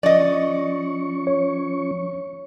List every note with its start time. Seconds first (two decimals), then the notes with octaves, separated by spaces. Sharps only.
0.03 F3 C#4 D5 D#5 C#6
1.27 C#5